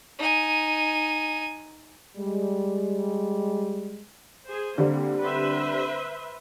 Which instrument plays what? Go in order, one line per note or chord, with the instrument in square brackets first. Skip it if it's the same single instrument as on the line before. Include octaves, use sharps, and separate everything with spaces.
[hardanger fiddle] D#4 G#5
[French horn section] G3 G#3
[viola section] G#4 C5
[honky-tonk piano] D3 G3 C4 [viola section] A#3
[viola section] B4 C5 E5